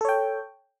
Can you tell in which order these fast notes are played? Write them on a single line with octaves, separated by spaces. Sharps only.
A4 C#5 G5